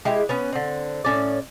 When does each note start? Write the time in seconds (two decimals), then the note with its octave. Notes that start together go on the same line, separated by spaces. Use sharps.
0.05 G#3 E4 G4
0.29 B3 C#4 B4
0.53 D3 C4
1.05 A2 C#4 D5